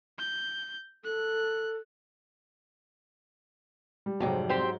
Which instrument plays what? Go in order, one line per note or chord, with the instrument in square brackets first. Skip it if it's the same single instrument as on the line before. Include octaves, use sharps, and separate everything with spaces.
[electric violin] G6
[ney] A4 [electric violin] F#6
[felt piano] G3
[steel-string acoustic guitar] F2 C3 G3 [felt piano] G#2 F#3
[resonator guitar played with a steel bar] C4 G4 C5